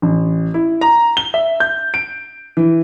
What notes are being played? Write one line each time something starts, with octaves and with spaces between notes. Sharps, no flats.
A1
E4
A#5
G7
E5
G6
D7
E3